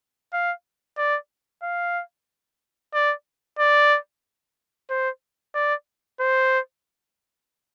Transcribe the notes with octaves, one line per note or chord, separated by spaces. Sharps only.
F5
D5
F5
D5
D5
C5
D5
C5